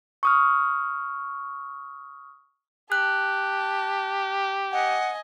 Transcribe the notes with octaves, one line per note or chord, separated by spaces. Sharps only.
C#6 D#6 F6
G4 A5 F#6
D#5 F#5 G#5